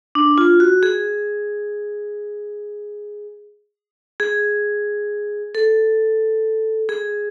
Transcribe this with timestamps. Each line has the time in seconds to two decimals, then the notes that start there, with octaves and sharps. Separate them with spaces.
0.15 D4
0.38 F4
0.60 F#4
0.83 G#4
4.20 G#4
5.55 A4
6.89 G#4